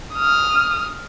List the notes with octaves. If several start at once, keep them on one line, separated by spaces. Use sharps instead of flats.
D#6 F6